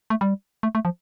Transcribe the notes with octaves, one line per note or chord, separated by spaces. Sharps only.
A3
G3
A3
A3
F3